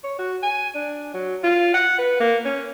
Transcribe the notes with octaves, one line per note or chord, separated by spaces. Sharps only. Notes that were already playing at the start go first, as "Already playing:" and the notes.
C#5
F#4
G#5
D4
F#3
F4
F#5
B4
A#3
C#4